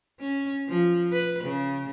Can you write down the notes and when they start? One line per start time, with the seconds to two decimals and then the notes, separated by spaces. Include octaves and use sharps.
0.20 C#4
0.69 F3
1.12 B4
1.44 C#3